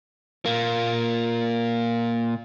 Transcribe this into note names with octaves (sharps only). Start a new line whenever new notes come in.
A#2 A#3